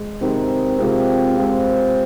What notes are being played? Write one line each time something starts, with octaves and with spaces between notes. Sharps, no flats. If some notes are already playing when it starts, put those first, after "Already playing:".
Already playing: G#3
C3 D#3 G#3
C3 F3 G#3 C4
C3 F3 G#3 C4